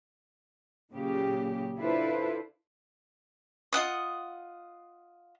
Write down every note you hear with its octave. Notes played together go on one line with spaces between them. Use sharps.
A#2 C#3 F#3 G4
D4 E4 F4 A4 B4 C5
F4 D#5 F#5 D#6